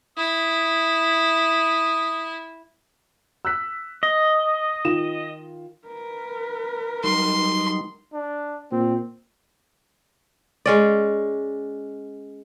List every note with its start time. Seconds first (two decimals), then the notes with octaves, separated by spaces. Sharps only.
0.17 E4 D#6
3.45 E6 F#6 B6
4.03 D#5
4.85 D#3 F4 E7
5.88 A#4 B4
7.04 F#3 G3 D#4 C6
8.13 D4
8.72 A#2 C4
10.66 G#3 C#4 D5